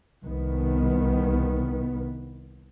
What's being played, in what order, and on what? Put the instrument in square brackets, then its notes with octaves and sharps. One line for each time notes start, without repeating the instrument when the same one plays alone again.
[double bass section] C2 D#3 B3